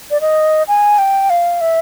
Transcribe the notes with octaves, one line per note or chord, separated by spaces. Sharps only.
D5
D#5
G#5
G5
F5
E5